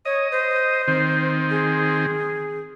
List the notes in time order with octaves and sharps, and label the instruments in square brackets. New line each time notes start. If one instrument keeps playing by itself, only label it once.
[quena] C#5 [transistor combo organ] D#5
[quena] C5
[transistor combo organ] D#3 C4
[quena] G#4